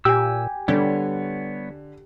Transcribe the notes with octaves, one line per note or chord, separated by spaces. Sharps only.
A#2 G4 G#5 E6
D3 G3 B3 C#5